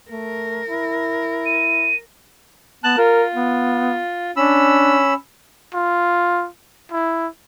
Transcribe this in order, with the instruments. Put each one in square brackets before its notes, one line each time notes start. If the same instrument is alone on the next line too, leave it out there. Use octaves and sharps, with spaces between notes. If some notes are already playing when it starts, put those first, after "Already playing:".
[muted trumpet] A3 [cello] A#4
[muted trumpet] E4
[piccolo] D#7
[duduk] B3 [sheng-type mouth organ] A5 F#6
[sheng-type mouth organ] F4 [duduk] A#4
[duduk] B3
[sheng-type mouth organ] C#4 B5 E6 [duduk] D4
[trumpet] F4
E4